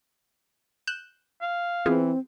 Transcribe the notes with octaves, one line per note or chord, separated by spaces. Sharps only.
F#6 G6 E7
F5
E3 B3 C4 F4 G#4